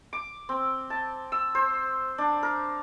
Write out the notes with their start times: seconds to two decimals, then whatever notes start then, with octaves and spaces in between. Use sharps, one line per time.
0.13 D6
0.49 C4
0.90 A5
1.32 E6
1.55 C5
2.18 D4
2.43 A#4